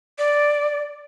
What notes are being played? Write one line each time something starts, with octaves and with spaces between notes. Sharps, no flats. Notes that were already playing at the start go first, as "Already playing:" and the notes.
D5